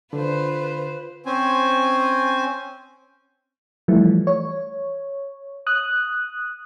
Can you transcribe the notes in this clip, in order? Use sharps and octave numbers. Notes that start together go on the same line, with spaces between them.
D3 F4 B4 C5
C4 C#4 C5 G#5
E3 F3 G3 A3
C#5
D#6 F#6